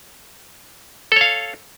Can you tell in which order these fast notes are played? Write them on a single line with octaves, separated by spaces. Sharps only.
A4 C#5 F5